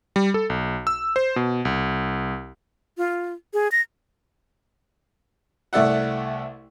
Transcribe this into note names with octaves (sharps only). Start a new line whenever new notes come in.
G3
A4
B1
E6
C5
B2
C2
F4
G#4
A#6
C2 A3 D5 E5 F#5